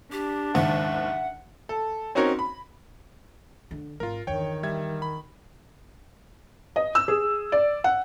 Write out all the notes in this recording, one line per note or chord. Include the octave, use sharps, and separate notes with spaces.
D4 G4
F#1 D#2 G#2 E5 F#5
A4
C4 C#4 D#4 F#4 A#4 C#5
B5
D3
G#1 F4 A#4
G1 E2 D#3 C#5 G5
G3 E5 G#6
B5
D#5
E6
G#4
D5
F#5